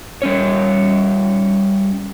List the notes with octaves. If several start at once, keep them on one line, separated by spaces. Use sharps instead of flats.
G3 C#4 C#5